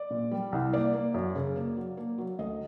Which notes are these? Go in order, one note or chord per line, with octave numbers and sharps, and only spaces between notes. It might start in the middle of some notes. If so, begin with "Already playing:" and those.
Already playing: D5
A#2
G3
C2
A#3 D5
A#3
F#2
C#3
A#3
F#3
A#3
F#3
D2 D#5